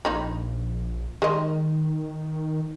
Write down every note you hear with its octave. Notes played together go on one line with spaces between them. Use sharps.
A#1 A#3 D#4 B5
D#3 G#3 A#4 D#5